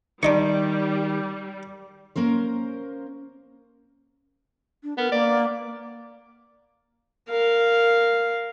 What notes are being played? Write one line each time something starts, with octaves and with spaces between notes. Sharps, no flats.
D#3 G3 D4 D#5 C#6
A#3 C#4 A#4 C5
D4
B3 A#4
A#3 D5
A#4 F5